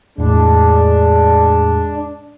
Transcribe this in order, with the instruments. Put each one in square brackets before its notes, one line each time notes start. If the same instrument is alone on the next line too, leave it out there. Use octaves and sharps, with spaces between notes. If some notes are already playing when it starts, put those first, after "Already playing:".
[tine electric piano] E2 A2 [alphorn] G#3 [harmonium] D4